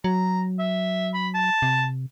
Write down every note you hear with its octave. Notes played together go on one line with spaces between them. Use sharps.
F#3 A#5
E5
B5
A5
C3